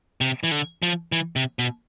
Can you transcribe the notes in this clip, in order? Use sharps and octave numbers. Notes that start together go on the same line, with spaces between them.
C3
E3
D3
F3
E3
C3
B2